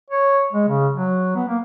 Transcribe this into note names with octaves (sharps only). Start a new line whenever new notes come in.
C#5
G#3
C#3
F#3
B3
A#3